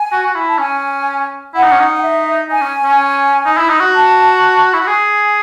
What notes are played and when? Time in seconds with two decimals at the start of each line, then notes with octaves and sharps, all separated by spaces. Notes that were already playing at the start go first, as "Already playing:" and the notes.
Already playing: G#5
0.12 F#4
0.27 F#4
0.35 E4
0.49 A5
0.58 C#4 G#5
1.54 E4 F#5
1.63 D#4
1.72 C#4
1.79 D#4
1.97 F#5
2.02 E5
2.49 D#4 G#5
2.61 C#4
2.84 C#4
3.45 D#4
3.58 E4
3.69 D#4
3.80 F#4
3.93 A5
4.73 E4
4.80 F#4
4.87 G#4 G#5